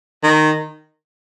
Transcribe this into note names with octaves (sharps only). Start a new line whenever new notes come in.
D#3